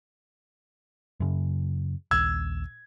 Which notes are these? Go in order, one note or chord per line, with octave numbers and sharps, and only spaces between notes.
F#2 C#3
A#1 D#2 E6 G#6